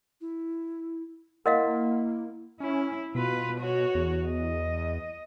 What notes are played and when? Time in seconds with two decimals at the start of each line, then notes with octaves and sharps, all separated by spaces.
0.21 E4
1.46 A#3 E4 A#4 D#5 F5 F#5 C6
2.60 C#4 E4
3.15 B2 F4 B4
3.60 F#4 C#5
3.95 E2
4.28 D#5